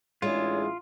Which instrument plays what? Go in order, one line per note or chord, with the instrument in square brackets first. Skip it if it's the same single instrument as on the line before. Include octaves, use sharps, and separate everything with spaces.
[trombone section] A1 E4 G#4 [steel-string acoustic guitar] G#3 D4 [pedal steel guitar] F4 [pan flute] C#5